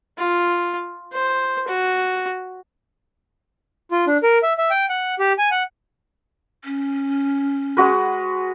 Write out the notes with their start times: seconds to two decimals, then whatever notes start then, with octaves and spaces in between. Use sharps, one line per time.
0.18 F4
1.13 C5
1.68 F#4
3.91 F4
4.07 D4
4.23 A#4
4.43 E5
4.58 E5
4.70 G5
4.89 F#5
5.19 G4
5.38 G#5
5.51 F#5
6.65 C#4
7.77 G#3 F#4 B4